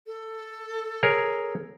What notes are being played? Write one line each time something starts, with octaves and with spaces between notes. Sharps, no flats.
A4
G#4 A#4 C#5